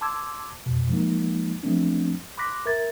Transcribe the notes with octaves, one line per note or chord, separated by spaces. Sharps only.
A5 C6 D6 E6 G#6
F2 B2
F3 G#3 A#3 D#4
F3 F#3 A3 B3 C4 D4
B5 C6 D6 F#6 A#6 B6
A#4 E5 G#6 A6